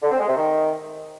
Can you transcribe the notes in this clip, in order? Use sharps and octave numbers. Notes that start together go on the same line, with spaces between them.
D3
C4
G#3
C3
D#3